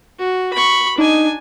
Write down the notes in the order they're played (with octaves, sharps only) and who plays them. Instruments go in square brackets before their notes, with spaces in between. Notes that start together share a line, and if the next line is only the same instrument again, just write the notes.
[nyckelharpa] F#4
B5 C#6
[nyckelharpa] D4 G#5 [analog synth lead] D#4